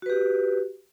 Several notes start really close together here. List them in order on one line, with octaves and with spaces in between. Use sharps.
F#4 B4 G4